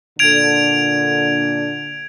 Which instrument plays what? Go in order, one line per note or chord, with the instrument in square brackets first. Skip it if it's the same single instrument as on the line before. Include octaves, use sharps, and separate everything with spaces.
[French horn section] A#2 D3 [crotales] G#6 D7 F7